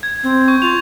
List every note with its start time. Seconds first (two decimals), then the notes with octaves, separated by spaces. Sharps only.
0.03 G#6
0.23 C4
0.48 C#6 G6
0.62 F4 F7